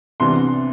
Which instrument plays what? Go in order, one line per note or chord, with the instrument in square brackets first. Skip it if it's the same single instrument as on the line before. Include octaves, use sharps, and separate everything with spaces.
[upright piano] C2 C3 E3 B3 D4 C6